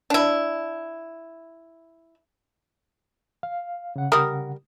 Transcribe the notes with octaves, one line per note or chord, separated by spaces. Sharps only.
D4 E4
F5
C#3 F#5
G3 A#4 D#6